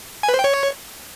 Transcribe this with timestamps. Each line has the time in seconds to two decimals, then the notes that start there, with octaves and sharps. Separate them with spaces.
0.23 G#5
0.29 B4
0.34 C5
0.39 G5
0.44 C#5